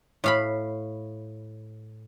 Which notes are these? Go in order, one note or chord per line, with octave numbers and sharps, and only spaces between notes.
A2 F5 B5